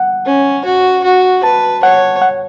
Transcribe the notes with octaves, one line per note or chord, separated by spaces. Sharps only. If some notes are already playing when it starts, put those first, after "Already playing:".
Already playing: F#5
C#4
F#4
F#4
B4 A5
C#5 F#5
F#5